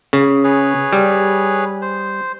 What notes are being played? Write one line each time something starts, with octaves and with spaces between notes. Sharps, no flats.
C#3
G#4 B4 C#5
G3
C5